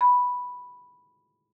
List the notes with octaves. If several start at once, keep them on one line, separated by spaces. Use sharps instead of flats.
B5